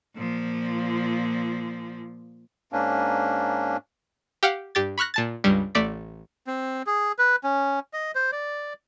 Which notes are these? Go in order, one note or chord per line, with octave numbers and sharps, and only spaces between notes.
A#2 F3
G#2 A#3 C#4 D4
G4 F5 F#5
G2 G4 A6
B5 C#6 F6 F#6 A#6
A#2 A5 A6
C#2 G2 G3
A1 A3 D5 D6 B6
C4
G#4
B4
C#4
D#5
C5
D5